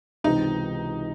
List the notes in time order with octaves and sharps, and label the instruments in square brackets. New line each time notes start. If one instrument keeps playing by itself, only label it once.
[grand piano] C#2 C3 E3 C4 [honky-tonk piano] D#4